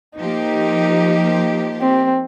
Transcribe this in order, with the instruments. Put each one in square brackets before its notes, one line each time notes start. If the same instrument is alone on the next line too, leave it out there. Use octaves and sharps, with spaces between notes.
[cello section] F3 A#3 G4 [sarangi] D#4
[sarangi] C4